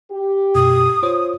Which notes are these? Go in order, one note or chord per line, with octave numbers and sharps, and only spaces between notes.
G4
F#2 B2 D#6
F4 C5 C#5